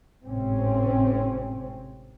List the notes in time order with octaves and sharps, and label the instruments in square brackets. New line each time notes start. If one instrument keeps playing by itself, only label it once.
[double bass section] G#1 A2 C3 C4 C#4